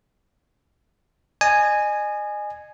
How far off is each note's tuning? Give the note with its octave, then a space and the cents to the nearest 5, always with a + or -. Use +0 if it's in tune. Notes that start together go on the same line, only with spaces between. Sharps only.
D#5 -35 G#5 +0